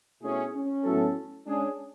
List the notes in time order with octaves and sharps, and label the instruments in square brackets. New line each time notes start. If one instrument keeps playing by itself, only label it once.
[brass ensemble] B2 A3 E4 G#4 [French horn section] C#4
[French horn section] C#4
[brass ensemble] A2 F#3 B3 E4 A4
[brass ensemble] G#3 C#4 G#4 [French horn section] D4